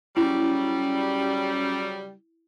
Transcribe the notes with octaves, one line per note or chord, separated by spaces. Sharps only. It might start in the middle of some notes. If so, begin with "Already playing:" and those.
C#3 F#3 G3 C#4 E4